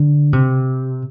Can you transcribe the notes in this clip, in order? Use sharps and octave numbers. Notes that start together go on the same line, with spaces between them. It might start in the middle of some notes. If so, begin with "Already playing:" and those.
Already playing: D3
C3